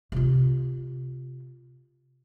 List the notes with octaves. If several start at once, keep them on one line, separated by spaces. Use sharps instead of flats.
C3 F4